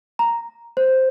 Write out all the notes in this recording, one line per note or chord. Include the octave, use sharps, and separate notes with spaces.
A#5
C5